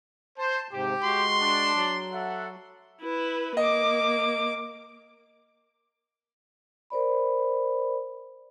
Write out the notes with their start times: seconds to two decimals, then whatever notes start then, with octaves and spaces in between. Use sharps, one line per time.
0.38 C5 A5
0.72 G#2 C3 G4
1.04 G#3 F#4 C6
1.38 D4
1.74 F#3
2.13 A4 E5 F#5
3.01 E4 B4
3.57 A#3 D#5 D6
6.90 A#4 C5 D5 B5